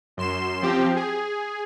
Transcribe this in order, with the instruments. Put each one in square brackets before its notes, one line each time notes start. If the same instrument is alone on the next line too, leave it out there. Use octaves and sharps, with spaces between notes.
[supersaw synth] F#2 C6 E7
F3 C4 G4
G#4